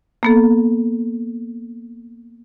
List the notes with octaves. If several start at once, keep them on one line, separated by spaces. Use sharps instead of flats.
A#3 B3 A4